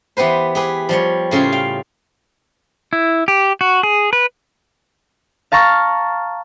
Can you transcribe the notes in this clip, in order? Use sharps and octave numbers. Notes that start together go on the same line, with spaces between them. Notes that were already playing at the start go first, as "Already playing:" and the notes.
E3 B3 G4 B4 C5
G4 G#4 B4
F3 G3 C#5
A2 C#3 G3 F4 G#4
F5 G5
E4
G4
F#4
G#4
B4
F5 A5 A#5 C#6 F6